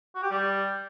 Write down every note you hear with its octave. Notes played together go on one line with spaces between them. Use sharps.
F#4
G4
G3